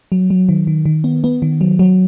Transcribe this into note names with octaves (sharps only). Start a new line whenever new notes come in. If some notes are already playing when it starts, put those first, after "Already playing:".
F#3
F#3
D#3
D#3
D#3
B3
B3
D#3
F#3
F#3